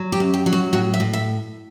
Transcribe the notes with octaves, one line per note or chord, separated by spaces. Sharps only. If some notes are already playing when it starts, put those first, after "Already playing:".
Already playing: F#3
G4
F#2
G4
F#3
F#4
A2 F#4
E5
A2
E5